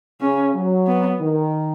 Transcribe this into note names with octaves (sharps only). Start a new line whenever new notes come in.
C#3 C#4
F#3
B3
D#3